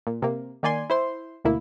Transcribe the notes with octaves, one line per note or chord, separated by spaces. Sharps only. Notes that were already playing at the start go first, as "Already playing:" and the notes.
A#2
C3 A#3
D#3 A#3 D5 G#5 C6
E4 C5 C6
D2 B2 A#3 E4